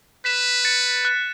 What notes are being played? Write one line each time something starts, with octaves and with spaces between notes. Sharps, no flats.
B4 B6 E7
A6 C#7
F#6